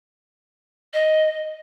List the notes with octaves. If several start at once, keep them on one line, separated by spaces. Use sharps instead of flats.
D#5